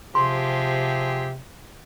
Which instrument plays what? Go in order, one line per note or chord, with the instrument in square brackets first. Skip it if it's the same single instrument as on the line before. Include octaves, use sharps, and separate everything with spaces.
[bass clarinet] C3 [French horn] F3 [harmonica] C4 G4 G#4 [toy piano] C6